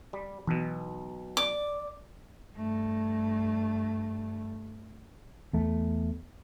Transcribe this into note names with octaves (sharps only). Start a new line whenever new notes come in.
G3
B1 B2 E3
D5 D6
G2 A3
E2 A3